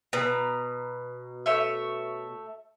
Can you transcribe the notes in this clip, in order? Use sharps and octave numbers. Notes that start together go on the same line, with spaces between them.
B2 B4 A#5 D#6
A3 C#5 E5